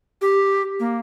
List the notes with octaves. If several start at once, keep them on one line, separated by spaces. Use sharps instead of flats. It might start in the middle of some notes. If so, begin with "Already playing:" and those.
G4
A#3